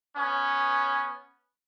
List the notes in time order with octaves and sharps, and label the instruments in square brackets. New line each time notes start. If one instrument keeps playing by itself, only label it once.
[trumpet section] B3 C#4